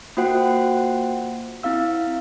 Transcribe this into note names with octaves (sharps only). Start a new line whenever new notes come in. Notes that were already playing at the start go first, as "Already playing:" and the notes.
A#3 F4 F#4 C5 F#5 G5
C4 E4 F5 E6